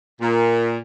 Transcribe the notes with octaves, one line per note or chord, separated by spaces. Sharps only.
A#2